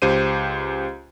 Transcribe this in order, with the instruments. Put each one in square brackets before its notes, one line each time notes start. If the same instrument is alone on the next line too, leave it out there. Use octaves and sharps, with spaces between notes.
[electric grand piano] C#2 G4 C5 D#7